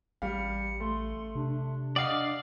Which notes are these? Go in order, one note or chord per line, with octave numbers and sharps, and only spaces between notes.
A1 G3 F5 C#7
A3 C6
C3 D4
D5 D#5 F5 F#5 D#6